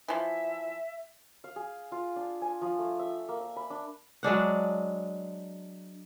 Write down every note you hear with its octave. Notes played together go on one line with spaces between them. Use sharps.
E3 F3 E5
F5
G#4
F4
D4
G#5
F3
A3
E5
A#3
E5
B5
D4
F#3 G#3 D4 F#5